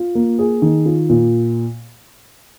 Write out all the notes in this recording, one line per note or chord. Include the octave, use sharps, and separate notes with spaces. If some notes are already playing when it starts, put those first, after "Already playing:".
Already playing: F4
A#3
G#4
D#3
F4
A#2